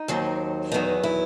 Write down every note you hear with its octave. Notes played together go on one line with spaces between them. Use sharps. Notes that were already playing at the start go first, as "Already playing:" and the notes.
Already playing: D#4
D#2 D#3 F#3 C4
E2 D#3 F#3 B3 D#4
E4